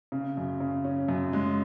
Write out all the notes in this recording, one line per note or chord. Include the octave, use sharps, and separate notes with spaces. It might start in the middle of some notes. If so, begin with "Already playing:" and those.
C#3
F#2
C#3
C#4
F#2
G#3